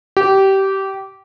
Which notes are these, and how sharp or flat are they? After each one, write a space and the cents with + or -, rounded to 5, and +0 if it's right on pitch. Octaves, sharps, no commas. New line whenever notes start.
G4 -20